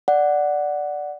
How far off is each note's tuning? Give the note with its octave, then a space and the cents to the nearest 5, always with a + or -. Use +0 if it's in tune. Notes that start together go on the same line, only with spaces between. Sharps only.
D5 +0 F#5 +0